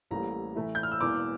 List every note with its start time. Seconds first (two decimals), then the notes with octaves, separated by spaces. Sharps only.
0.11 A1 A2 G3 A#3 A#5
0.56 A2 E3 A3 E4
0.75 G6
0.83 F6
0.92 E6
1.01 E1 E2 E3 A#3 D6